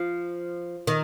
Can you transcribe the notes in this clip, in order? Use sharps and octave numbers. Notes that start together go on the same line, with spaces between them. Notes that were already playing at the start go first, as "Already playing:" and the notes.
Already playing: F3
D#3